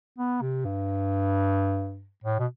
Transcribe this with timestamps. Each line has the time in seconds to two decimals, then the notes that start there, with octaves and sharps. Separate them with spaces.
0.18 B3
0.41 C3
0.65 G2
2.24 A2
2.39 B2